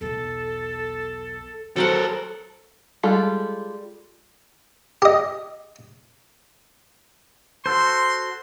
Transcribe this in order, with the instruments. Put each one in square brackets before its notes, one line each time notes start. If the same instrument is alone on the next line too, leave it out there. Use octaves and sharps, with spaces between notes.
[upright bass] B1 E2 [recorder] A4
[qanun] F#3 C5 F#5 [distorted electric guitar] A4 A#4
[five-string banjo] G3 G#3 F4 A4
[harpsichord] G4 D#5
[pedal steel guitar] F#4 A4 C5 [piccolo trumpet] C6